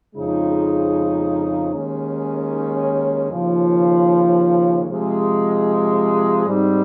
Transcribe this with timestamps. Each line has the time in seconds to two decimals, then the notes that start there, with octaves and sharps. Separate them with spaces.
0.15 F2 C#3 F3 G#3 D#4
1.73 D#2 D#3 G#3 C#4
3.30 D#2 C#3 F3
4.89 C3 F3 G#3
6.46 G#2 G3 C4 D#4